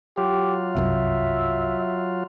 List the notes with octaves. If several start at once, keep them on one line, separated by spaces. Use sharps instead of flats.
F#3 F4 G4
G1 C2 F#2 E5